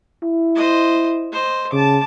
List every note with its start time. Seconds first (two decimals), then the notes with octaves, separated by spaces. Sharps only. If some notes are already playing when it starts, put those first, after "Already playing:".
0.23 E4
0.55 C5 D#5
1.32 C5 D#5
1.73 C#3 A5 D6